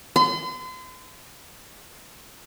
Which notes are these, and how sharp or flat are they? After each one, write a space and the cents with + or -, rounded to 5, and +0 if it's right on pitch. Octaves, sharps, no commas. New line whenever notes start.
C6 -40